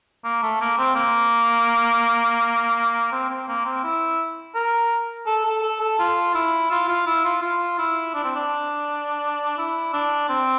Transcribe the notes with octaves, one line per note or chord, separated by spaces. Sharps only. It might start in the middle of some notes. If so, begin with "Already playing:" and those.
A#3
A3
A#3
C4
A#3
C4
C4
A#3
C4
E4
A#4
A4
A4
A4
A4
F4
E4
F4
F4
E4
F4
F4
E4
D4
C4
D4
E4
D4
C4